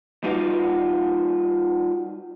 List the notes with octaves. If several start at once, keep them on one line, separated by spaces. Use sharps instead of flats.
G3 D#4 F4 F#4 B4 F5